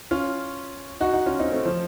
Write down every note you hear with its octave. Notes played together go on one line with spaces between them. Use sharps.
C#4 F4
D#4 F#4
D#4 F#4
C#4 F4
C4 D#4
A3 C4
F3